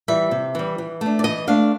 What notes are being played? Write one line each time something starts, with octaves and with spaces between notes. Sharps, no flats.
E3 G3 E5
C3
E3 G3
E3
A3 D4
D5
E3 D#5
A3 D4 F5